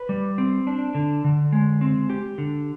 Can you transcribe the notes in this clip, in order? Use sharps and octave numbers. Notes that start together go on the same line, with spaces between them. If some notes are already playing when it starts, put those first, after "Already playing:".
Already playing: B4
G3
C4
D4
D3
D3
G#3
C4
G4
D3